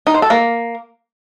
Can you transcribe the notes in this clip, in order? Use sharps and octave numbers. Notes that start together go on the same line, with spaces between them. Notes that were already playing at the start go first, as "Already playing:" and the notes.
D#4
C5
A4
A#3